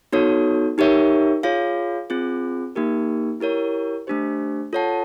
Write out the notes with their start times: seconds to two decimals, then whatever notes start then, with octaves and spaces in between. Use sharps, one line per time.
0.12 B3 D#4 F#4 A4 C#5
0.78 D#4 G4 A#4 C#5 E5
1.43 F4 G#4 C#5 F5
2.10 C4 F4 G#4
2.75 A#3 D#4 G4 A#4
3.40 E4 G4 A#4 C#5
4.07 A3 D4 G4 C5
4.73 F4 A4 C#5 F#5 A5